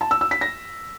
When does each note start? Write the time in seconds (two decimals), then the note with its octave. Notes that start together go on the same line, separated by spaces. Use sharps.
0.01 A5
0.11 E6
0.21 E6
0.31 B6
0.41 A#6